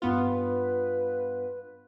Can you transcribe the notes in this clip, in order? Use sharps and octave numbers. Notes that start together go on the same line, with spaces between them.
G2 B3 F4 B4